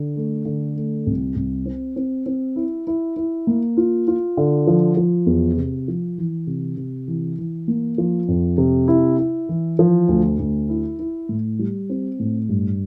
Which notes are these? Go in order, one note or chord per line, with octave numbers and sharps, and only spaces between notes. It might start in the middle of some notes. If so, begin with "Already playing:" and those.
Already playing: D3
A3
D3
A3
C2
C2
C4
C4
C4
E4
E4
E4
A#3
F4
F4
D3
F3
F3
E2
C3
F3
E3
C3
C3
E3
E3
A#3
F3
F2
C3
E4
E4
E3
F3
D2
D2
E4
E4
A2
G3
C4
A2
G2